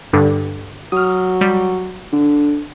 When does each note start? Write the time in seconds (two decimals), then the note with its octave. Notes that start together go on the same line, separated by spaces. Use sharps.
0.13 G2 D3
0.92 F#3 D#6 F6
1.41 G3
2.12 D3